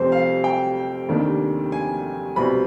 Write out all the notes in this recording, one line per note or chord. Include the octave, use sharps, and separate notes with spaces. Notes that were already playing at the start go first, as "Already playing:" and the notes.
Already playing: F1 F2 C3 G3 C4 C5
F5
G5
F1 D#2 D#3 G3 D4
G#5
C2 B2 G3 C4 B5